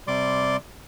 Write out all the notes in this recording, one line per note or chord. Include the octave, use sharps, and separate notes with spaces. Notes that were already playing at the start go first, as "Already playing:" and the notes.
C3 G3 D5 C6 D6